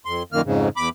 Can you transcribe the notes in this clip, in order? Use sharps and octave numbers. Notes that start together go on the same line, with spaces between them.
F2 C6
F#2 A#2 D#3 A#3 F6
F2 G#2 C#3
E2 B5 D6